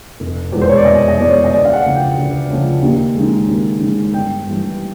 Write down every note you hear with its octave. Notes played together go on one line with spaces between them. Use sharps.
F1
E2 B2 G#3
C5
C#5
D5
F1 D#5
D#5
E2 B2 G#3 D5
C#5
D#5
D2 D5
F5
F#5
C#3 F3 A3
G5
D2
C#3 F3 A3
D#2
G#3
D#3
D#2
D#3 G#3
G1 G5
G2 E3 A3